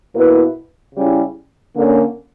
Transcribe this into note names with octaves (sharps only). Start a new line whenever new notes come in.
B2 A#3 E4 B4
C#3 G3 C#4 E4
D3 A#3 C#4